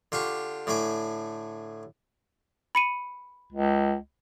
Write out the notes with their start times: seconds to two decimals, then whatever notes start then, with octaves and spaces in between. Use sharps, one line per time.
0.12 D3 F4 G4 C#6
0.67 A2 D3 A3 G#5 D6
2.75 B5 C#7 D#7
3.52 C#2